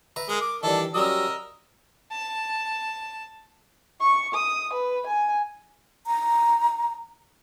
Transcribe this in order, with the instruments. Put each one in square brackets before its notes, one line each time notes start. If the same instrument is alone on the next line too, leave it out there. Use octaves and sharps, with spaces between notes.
[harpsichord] B4 E5 A#5
[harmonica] G#3 [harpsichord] A#4
[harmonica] D6
[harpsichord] D#3 E3 G3 [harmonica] D4 A4
[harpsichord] F#3 G3 C#4 [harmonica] A#4 D#5 E6
[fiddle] A5
[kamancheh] C#6
D#6
B4
G#5
[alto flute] A#5